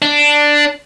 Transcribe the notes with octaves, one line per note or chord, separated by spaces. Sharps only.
D4